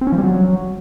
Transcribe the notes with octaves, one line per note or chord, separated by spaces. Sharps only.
C4
C#4
F3
G3
F#3